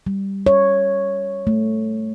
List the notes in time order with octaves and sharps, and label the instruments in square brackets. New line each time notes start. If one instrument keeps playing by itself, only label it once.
[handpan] G3
C#5
A3